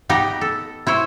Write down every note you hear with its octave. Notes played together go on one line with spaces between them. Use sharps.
B3 D#4 G4
A4
E4 C5 C#5